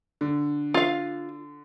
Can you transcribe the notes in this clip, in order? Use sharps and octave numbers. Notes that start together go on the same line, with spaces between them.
D3
F4 F5